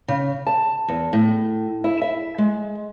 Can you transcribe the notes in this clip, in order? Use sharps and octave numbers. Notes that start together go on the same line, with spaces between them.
C#3
A5
E2
A2
E4
E5
G#3